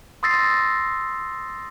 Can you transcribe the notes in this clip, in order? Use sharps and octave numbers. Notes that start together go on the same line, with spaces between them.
C6 D#6 E6 A6 A#6 C7